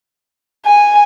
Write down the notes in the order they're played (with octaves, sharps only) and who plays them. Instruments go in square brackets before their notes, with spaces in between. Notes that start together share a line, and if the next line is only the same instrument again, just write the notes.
[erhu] G#5